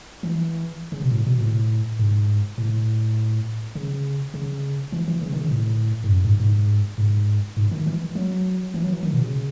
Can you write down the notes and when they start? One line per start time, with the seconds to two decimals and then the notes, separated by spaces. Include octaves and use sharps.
0.23 E3
0.92 C#3
1.02 B2
1.12 A2
1.27 B2
1.41 A2
1.99 G#2
2.58 A2
3.75 C#3
4.34 C#3
4.92 E3
5.08 E3
5.22 C#3
5.32 D#3
5.41 C#3
5.51 A2
6.04 G#2
6.09 F#2
6.25 G#2
6.40 G#2
6.98 G#2
7.57 G#2
7.71 D#3
7.86 E3
8.15 F#3
8.74 E3
8.83 F#3
8.93 E3
9.03 D#3
9.13 B2
9.22 C#3